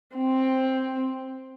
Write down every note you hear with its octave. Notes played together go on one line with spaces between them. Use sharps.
C4